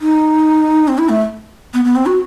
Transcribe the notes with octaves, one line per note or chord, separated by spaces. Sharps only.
D#4
C4
E4
A3
B3
B3
C4
F#4